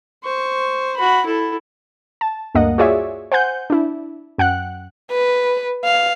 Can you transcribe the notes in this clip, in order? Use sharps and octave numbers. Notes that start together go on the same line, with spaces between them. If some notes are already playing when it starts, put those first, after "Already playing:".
C5 C#6
F#4 B5
E4 A4
A5
D2 G2 A#3 D#5 F#5
F4 F#4 G#4 C#5 D5 E5
C5 F#5 G#5 G6
D4 E4
F#2 F#5 G5 F#6
B4
F5